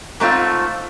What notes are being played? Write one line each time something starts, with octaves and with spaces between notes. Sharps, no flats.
G#2 A3 C4 F4